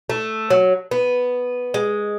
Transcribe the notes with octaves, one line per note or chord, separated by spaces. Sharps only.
A3
F#3
B3
G#3